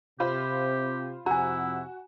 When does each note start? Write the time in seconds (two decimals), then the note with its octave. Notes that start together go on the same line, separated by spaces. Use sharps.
0.20 C3 F4 G4 C5 B5
1.26 F2 C3 E4 F#4 G#5 A#5